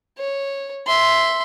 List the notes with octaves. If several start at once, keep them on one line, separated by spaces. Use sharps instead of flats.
C#5
E5 C6